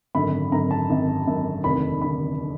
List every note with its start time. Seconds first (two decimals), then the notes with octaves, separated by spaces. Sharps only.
0.15 G#1 F#2 D3 B5
0.52 G#1 F#2 D3 A#5
0.71 A5
0.90 G#1 F#2 D3
1.27 G#1 F#2 D3
1.64 F1 D#2 D3 B5
2.02 F1 D#2 D3 B5
2.41 D3